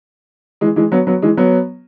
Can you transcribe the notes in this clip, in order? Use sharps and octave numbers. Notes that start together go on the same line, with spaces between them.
E3 G#3
E3 G#3
F#3 B3
F#3 B3
E3 G#3
F#3 B3